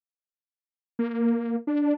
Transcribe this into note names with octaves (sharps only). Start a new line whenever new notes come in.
A#3
D4